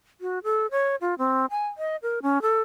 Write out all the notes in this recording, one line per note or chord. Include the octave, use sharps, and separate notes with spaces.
F#4
A4
C#5
F4
C4
G#5
D#5
A#4
C#4
A4